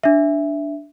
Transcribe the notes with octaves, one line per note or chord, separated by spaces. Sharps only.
D4 E5